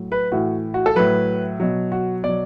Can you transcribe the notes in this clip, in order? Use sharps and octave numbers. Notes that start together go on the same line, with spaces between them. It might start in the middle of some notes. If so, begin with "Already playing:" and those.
Already playing: A2 F#3
B4
A2 E3 F#4
F#4
A4
A2 F#3 B4
B2 F#3
F#4
B2 D5
F#3